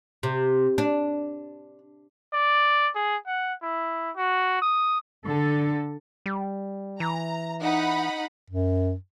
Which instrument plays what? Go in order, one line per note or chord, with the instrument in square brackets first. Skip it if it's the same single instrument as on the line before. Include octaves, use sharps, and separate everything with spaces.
[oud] C3
D4
[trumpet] D5
G#4
F#5
E4
F#4
D#6
[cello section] D3 A4
[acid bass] G3
[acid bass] E3 [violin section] A#5
[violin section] D#4 F#5 B5
[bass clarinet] F#2